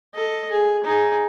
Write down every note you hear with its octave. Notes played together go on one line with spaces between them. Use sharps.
A4 D#5
G#4
D#4 G#4